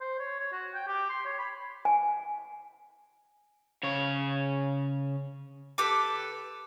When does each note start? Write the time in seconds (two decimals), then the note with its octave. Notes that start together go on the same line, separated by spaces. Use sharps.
0.01 C5
0.19 C#5
0.39 C#5
0.52 F#4
0.74 G5
0.87 G4
1.10 C6
1.25 C#5
1.39 B5
1.85 G#5
3.83 C#3 C#5
5.78 G4 A4 B4 D6